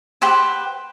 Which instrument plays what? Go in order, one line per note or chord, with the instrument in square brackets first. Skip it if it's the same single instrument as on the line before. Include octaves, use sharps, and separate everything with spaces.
[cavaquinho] G4 B4 C5 F#5